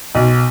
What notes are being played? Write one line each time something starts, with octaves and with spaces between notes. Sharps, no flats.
B1